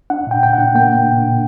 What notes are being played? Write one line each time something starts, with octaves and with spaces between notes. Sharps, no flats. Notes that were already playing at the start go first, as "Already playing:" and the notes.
D4 F#5
A#2 G5
A#2 G5
D4 F#5
A#3 G5
D4
A#2
A#2